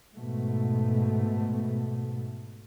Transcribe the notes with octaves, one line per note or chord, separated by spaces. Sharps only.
G#2 B2 A3